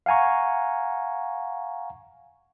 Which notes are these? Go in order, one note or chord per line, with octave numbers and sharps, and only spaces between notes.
F5 F#5 G#5 A#5 C#6